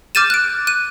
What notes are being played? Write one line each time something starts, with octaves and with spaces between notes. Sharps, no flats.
D6 F6 G6 A6 D#7 E7
F#6 D7
F#6 D#7